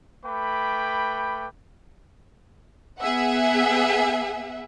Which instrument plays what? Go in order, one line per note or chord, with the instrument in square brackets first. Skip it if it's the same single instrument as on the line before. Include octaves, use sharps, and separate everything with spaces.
[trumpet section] A3 B4 G5 B5 D6
[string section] B3 G#4 E5 F#5